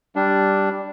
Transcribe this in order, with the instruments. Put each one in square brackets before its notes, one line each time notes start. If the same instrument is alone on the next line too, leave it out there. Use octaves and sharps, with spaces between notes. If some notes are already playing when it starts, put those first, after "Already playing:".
[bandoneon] G3 D4